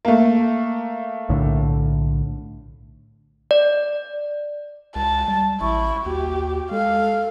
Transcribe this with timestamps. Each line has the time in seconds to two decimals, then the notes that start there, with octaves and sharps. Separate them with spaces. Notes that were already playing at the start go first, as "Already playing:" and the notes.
0.05 A3 A#3
1.29 B1 A2 D3
3.51 D5
4.96 C#2 A5
5.28 G3
5.61 A1 E4 C#6
6.06 D#2 F#4 G4
6.71 G#3 A4 F5